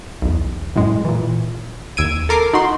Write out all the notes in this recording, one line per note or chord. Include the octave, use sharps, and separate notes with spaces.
B1 E2
F#2 A2 G#3
A#2 E3
D#2 E6 G#6 D7 D#7
A4 A#4 D6 C7
D#4 F#4 C6